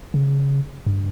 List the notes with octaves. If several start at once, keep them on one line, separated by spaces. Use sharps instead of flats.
C#3
G2